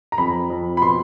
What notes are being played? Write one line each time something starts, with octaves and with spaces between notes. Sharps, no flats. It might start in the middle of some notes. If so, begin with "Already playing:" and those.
A#5
F2 B5
F2
B5
B2 C6